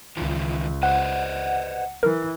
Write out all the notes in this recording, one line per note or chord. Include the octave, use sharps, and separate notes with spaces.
C#2 D#3 E3 F4
B4 C5 D#5 F#5
E3 A#4